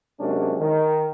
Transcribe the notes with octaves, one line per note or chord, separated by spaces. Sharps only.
C3 F#3 G#3 A#3 C#4 D4
D#3